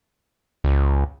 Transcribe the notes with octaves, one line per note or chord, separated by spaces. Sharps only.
C#2